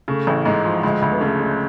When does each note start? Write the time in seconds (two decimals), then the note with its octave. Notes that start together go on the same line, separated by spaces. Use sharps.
0.08 C#3 A3
0.27 A1
0.45 G#2 G#3
0.65 F3
0.83 D2 G#3
1.02 D2
1.12 B3
1.21 C#3 A3
1.40 G#3